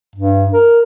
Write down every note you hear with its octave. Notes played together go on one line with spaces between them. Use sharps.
G2
A#4